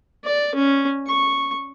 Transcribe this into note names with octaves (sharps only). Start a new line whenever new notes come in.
D5
C#4
C#6